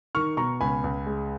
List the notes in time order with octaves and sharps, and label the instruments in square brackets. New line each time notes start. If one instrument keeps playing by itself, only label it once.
[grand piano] D#3 C#6 F6
B2 A#5 C#6
C#2 G#5 B5
C#2
G#3